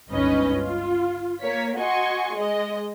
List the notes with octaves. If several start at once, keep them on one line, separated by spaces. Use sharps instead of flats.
G1 C#2 C#4 D#4 B4 D#5
F4
A#3 C#5 B6
F#4 D#5 G#5 C6 C#6
G#3 D#5